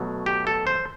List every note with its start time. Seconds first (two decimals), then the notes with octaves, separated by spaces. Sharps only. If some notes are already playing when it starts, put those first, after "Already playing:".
Already playing: B2 F#3 A3
0.26 G4
0.47 A4
0.67 C5